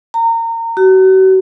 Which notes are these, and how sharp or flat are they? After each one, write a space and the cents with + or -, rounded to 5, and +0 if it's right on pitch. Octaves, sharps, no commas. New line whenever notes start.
A#5 -30
F#4 +40